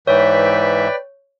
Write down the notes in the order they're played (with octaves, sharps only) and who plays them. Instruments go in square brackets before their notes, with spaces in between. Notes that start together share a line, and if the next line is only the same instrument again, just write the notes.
[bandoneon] G#2 E3 E5 [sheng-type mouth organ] B4 D5 G5 [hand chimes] C#5